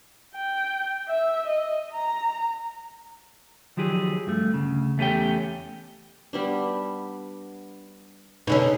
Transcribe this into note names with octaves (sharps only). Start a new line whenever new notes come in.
G5
E5
D#5
A#5
D#3 F3 F#3 G4 G#4
G2 A3
D2 C#3
E2 A3 C#4 G4 G5
G3 B3 D4
B2 D3 C#4 D#4 G#4